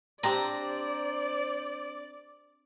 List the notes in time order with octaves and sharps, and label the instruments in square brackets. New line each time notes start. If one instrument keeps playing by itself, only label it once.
[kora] C4 D4 G4 [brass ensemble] C5 [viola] D5 [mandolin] A#5